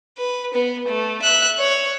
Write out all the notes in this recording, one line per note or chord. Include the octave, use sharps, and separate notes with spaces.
B4
B3
A3
E5 F#6
C#5